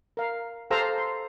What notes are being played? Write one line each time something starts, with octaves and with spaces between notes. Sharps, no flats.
A#4 F5
G4 A4 C5 F5 A#5 E6
C6